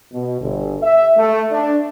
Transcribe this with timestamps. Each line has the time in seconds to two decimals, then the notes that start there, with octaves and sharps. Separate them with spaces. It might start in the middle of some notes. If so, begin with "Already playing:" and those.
0.12 B2
0.41 G1
0.83 E5
1.17 A3
1.51 D4